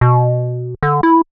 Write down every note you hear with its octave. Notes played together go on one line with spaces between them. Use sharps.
B2
D3
E4